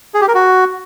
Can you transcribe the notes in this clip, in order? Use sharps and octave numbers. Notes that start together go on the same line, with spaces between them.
G#4
G4
A#4
F#4